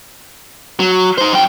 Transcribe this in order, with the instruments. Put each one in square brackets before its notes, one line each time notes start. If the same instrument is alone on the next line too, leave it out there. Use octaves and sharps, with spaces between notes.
[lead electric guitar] F#3
D#4 C5
F#2 G5